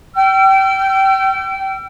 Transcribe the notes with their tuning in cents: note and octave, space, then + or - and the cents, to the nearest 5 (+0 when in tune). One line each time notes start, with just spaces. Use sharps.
G5 -25 E6 +40